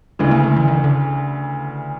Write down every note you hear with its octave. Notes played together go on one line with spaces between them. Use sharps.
D2 C#3 E3 G#3
A#3
A3
E3
D#3
D3